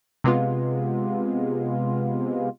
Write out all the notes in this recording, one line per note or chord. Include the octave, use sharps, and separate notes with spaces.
C3 G#3 B3 F4